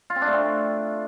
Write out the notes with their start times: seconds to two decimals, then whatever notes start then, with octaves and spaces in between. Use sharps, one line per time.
0.10 F4
0.16 C4
0.21 D4
0.27 A3
0.33 C4